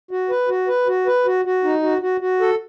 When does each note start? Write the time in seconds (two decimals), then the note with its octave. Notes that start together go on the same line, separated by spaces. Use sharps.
0.11 F#4
0.29 B4
0.49 F#4
0.68 B4
0.87 F#4
1.06 B4
1.26 F#4
1.45 F#4
1.64 D#4
1.83 F#4
2.02 F#4
2.21 F#4
2.41 A4